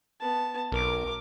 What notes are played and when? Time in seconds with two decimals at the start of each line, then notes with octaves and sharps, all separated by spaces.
0.20 B3 A5
0.72 B1 A#4 D6